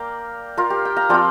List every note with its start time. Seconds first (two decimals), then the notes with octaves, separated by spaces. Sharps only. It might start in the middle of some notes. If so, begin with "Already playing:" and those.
Already playing: A#3 D5 F5 G5 A#5
0.57 F4 A#4
0.70 G4
0.85 G5
0.96 F5 A#5
1.09 F3 C4 F4 D5 G5